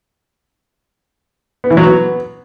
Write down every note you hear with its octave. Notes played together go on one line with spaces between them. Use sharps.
B3
E3
F#3
B3